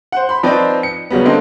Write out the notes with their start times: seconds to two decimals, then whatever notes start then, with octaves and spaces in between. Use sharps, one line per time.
0.12 C5 F#5
0.29 B5 C6
0.43 F3 C4 D#4 B4 C5 D5
0.83 C#7
1.10 C#3 F#3 G3 B3
1.25 D3 A#3 C4 D#5 C6